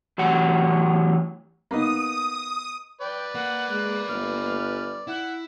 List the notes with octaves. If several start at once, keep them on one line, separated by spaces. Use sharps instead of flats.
E2 A2 F#3 G4 F#5
A#3 B3 D#4 D#6
B4 D5 G5
A#3 F#5
G#3 F#6
G1 F6
E4 F#5